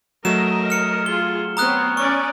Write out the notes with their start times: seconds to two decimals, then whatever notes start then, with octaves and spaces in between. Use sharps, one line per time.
0.25 F#3 A3 A#4 D#5 E7
0.70 F6 C#7
1.06 F4 G#4 G7
1.57 B3 C4 C#5 A#5 D#6 F#6
1.97 C#4 D5 C#6